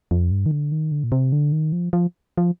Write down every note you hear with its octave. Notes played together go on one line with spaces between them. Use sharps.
F2
G2
D#3
D3
D#3
D3
A#2
C3
D3
D#3
F3
F3
F3